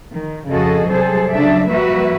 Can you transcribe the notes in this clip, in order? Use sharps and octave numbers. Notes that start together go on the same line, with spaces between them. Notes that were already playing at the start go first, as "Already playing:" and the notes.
D#3
F2 C#3 F#4 G#4 A4 D#5
C3 F#3 G3 G#4 A4 C5
C#3 F#3 D4 A4 D5 E5
F3 G3 A#3 F#4 B4 E5